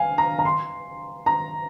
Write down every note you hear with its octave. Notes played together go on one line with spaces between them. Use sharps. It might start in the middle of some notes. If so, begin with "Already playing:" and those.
Already playing: F5 G#5
A#5
A#5
C6
A#5